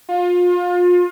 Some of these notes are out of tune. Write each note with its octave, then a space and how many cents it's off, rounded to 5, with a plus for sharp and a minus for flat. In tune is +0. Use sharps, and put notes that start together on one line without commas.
F4 +30